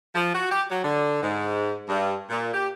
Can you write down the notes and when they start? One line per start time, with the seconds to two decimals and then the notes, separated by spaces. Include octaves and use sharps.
0.15 F3
0.35 F#4
0.51 G4
0.70 F#3
0.84 D3
1.23 G#2
1.88 G2
2.30 A#2
2.54 G4